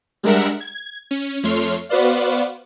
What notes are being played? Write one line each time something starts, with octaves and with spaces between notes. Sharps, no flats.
G3 G#3 D4 A#4 E5 F#5
G#6
C#4
F2 A3 C#5 C6 F6
B3 F#4 B4 C5 D5 F5